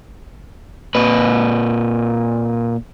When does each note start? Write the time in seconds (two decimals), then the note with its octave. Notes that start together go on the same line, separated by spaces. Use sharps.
0.95 A#2 B4